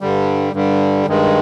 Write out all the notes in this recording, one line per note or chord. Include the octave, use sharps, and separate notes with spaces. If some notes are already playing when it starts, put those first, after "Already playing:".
G2 D3 G3
G2 D3 G3
G2 D#3 G#3